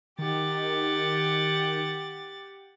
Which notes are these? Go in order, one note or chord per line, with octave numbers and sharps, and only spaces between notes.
D#3 G4 F#5 A6